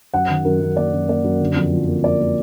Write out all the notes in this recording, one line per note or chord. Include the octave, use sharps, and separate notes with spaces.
F#2 F#5
D#3
F#2 A#4
F#2
A#3 D5
F#2
A#3 D5
F#2
D3
F2
F3
A#3
A#3 D5
A#3